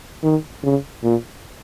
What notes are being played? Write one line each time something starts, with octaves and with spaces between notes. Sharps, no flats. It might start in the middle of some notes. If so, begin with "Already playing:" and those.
D#3
C#3
A#2